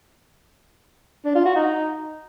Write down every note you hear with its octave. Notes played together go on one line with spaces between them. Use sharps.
D4
F4
F#4
D#4